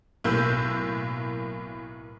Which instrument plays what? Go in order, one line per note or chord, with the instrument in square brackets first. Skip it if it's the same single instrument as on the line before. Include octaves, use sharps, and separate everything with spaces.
[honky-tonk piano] B1 A2 A#3 E6 G6